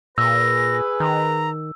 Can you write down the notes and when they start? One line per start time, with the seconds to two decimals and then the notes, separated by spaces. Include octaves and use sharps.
0.18 A#2 G#4 B4 E6 A#6
1.00 D#3 A#5